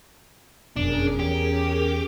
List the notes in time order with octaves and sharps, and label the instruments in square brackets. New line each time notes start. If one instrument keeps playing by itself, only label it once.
[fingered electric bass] F#1 F2 B2 [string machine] C#4 G#4 A#4 [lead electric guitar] D4
[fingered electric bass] E2 [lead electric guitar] G4